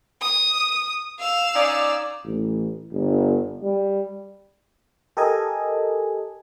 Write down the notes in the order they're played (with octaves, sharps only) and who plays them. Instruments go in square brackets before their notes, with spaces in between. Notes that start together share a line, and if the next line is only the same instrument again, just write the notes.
[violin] D#6
F5 E6
[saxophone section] C#4 D#4 D5
[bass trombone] A1
G1
G3
[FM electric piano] G4 A4 A#4 D#5 G#5